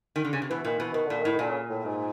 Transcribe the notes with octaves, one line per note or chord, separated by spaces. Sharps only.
D#3
D3
C#3
C3
B2 E3
A#2 D#3
B2 E3
B2 D#3
A#2 D3
D#3
A2
D#3
A#2 D3
C#3
A2
G#2